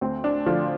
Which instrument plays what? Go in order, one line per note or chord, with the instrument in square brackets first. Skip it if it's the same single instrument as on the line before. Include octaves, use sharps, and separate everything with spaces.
[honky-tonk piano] D2 C4
D4
D3 F3 F4